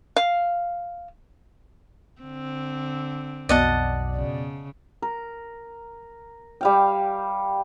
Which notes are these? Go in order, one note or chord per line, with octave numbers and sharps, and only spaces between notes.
F5
D3 C4
B1 F2 B2 D5 D#5 F#5 A5
C#3
A#4
G3 F5 G5